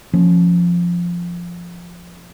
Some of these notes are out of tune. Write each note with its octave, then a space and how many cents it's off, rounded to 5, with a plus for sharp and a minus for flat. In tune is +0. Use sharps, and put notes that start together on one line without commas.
F3 +0 A#3 +0 C#4 +0